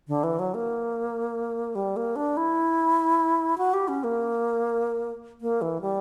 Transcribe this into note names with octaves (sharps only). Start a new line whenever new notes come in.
D3
E3
F#3
A#3
G3
A#3
D4
E4
F#4
G4
C#4
A#3
A#3
E3
G3